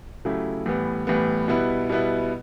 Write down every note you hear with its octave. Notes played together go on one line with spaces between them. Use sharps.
C#3 F#3 A3 E4 G4
A2 E3 G3 B3
A2 E3 G3 B3
B2 G3 B3 E4
B2 G3 B3 E4